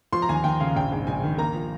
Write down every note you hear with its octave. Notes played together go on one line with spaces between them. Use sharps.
F3 C6
A#5
D#2 G#5
D#2 G5
C#3 F5
A#1 G5
G#2
A#1 G#5
D#3
A#3 A#5
F3